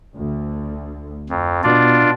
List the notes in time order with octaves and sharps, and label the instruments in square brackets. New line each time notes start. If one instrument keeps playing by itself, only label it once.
[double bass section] D2
[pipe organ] F2
[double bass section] B2 [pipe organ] D4 F4 D5